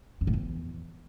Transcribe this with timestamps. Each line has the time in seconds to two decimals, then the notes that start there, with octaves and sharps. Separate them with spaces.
0.21 F#2
0.27 A2
0.33 E2